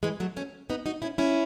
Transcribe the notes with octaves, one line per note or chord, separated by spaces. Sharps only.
E3 G#3
F#3 A3
A3 C#4
B3 D#4
D#4 F#4
C#4 E4
C#4 E4